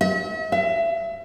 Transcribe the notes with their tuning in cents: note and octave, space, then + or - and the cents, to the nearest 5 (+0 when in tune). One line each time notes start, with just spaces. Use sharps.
E5 -45
E5 +30